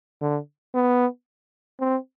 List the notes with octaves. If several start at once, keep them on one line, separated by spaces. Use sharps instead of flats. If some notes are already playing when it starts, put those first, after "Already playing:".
D3
B3
C4